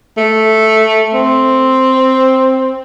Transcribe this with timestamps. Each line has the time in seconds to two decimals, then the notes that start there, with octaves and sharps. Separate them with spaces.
0.17 A3
1.14 C4